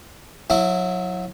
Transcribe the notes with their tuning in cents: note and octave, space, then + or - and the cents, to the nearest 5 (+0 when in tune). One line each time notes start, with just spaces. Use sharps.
F#3 -25 E4 +0